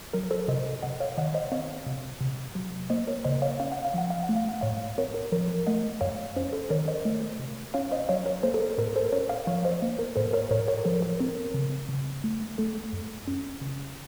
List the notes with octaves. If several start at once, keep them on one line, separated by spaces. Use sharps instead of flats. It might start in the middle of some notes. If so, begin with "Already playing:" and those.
F#3 A#4
A4 C5
C3 C5 D#5
C3 D#5 F#5
C#5 F5
D#3 D#5 F#5
C5 D#5
C4 C#5 F5
C3
C3
F#3
A#3 C5 D#5
A#4 C#5
C#3 C5 D#5
C#5 F5
C#4 F5
F#5
F5
F3 F#5
F5
F#5
A3
F5
F#5
A2 C#5 F5
C4 A#4 C#5
A#4
F3 A#4
A#4
A3 D#5 F#5
F#2 C#5 F5
C#4 C5 D#5
A4 C5
D#3 A#4 C#5
C5 D#5
A3
C3
C#4 C#5 F5
C5 D#5
F#3 C#5 F5
A#4 C#5
A#3 A4 C5
A4
A#4
A2 A#4
A4 C5
C#4 A#4 C#5
C#5 F5
F3 C#5 F5
C5 D#5
A#3
A#4
A2 A4 C5
A#4 C#5
A2 A#4 C#5
A#4 C#5
F3 A4 C5
A#4
C4 A#4
C#3
C#3
A3
A3 A4
F#2
C#4
C#3